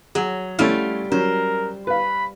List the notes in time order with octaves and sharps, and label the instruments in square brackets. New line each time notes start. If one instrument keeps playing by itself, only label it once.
[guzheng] F#3 [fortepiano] G#4
[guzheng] G3 F4 F5 [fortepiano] A3 C#4 E4
[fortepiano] F#3 C#4 [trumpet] A#4 [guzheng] C5
[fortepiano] B4 F5 [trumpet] B5